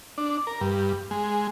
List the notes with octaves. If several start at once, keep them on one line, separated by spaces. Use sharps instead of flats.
D4
A#4
G2
G#3